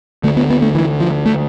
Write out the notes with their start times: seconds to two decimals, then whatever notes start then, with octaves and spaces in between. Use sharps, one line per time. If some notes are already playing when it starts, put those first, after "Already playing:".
0.24 D2 D3 A3
0.37 B3
0.50 B3
0.62 A3
0.75 E3
1.00 F3
1.26 A3